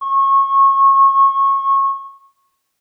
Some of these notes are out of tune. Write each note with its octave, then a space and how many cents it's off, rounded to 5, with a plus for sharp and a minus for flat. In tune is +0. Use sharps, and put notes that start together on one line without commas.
C#6 -25